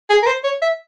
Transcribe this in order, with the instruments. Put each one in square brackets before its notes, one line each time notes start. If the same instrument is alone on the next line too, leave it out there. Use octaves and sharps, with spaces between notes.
[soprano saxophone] G#4
A#4
C5
C#5
E5